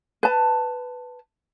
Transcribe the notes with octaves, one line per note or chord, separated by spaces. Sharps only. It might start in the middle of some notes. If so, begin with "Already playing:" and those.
B4 A5